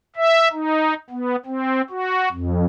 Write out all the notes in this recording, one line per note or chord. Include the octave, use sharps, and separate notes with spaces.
E5
D#4
B3
C4
F#4
F2